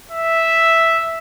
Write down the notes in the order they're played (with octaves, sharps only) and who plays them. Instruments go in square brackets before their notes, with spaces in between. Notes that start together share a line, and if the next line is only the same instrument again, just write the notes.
[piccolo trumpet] E5